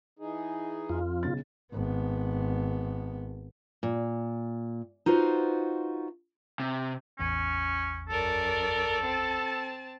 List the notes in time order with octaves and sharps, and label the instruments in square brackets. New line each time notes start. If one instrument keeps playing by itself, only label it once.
[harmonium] E3 D#4 G#4
[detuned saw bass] F2 [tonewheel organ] F4
[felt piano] B1 C#3 A6
[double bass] G#1 B3
[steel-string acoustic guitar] A#2
D#4 F4 F#4 B4 C5
[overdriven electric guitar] C3
[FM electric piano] A1 E2 [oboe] C#4
[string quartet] F#2 A#4 D5 [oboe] A4
[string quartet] C4 A5